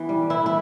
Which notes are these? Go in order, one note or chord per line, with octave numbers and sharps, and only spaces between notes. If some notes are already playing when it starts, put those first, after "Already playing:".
Already playing: E3 B3
G3
E3 E4
E4